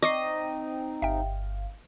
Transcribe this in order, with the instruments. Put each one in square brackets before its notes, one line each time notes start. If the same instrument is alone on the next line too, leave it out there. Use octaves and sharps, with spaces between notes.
[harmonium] C4 D#4 [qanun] D#5 [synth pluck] C#6 D6 C7
[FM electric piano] G1 F5 [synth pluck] E5 G5